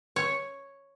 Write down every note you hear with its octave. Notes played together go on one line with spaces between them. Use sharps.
C#5